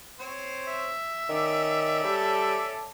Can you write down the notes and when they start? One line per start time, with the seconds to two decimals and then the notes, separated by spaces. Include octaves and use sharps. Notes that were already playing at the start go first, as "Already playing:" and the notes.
0.19 C4 C5 C#5
0.68 E5
1.29 D#3 C#4 D5 D6
2.04 G3 A4